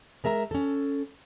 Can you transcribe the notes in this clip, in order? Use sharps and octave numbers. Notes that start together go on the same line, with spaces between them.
G#3 A#4 E5 A5 A#5
C#4 A4